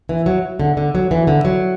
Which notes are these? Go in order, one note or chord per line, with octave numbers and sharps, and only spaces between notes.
E3
F#3
D3
D3
F#3
E3
D3
F#3